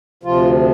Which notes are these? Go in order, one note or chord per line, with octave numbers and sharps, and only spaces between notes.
D2 C3 F3 F4